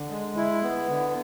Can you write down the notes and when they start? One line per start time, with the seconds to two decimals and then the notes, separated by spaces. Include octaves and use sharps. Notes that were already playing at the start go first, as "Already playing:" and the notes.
Already playing: D3
0.10 G#3
0.36 E4
0.63 B3
0.89 D3